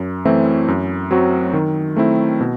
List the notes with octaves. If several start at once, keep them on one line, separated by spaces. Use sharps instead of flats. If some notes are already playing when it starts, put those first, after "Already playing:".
Already playing: F#2
E3 A3 C4 E4
F#2
F#3 C4 F#4
D#3
A3 C4 E4
B2